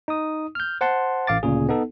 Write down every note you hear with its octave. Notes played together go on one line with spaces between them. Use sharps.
D#4 D#6
F6 G6
C5 F#5 A5 C6
A1 F5 D6 A6
D2 A#2 C#3 G#4
B3 D#4 A4